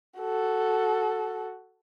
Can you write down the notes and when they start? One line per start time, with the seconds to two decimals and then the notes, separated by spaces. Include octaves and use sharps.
0.19 F#4 A4